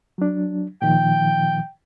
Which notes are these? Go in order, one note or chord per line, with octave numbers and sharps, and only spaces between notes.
F#3 D4
A#2 D#3 F3 G5